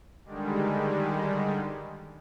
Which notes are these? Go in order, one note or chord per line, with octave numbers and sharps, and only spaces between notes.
D3 D#3 G3 G#3